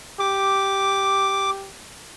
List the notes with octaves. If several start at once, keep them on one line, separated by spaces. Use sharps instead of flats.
G4 D6